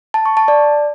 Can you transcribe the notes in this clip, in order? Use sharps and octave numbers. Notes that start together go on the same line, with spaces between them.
A5
C#6
A5
D5